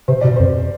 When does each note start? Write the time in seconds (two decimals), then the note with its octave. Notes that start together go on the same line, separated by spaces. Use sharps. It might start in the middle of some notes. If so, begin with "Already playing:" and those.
0.08 C3 C5
0.21 B2 D5
0.36 F2 C5